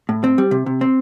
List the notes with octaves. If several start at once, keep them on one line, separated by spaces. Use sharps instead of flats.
A2
C4
G3
C3
C3
C4